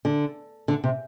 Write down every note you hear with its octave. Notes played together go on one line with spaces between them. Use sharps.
D3
D3
C3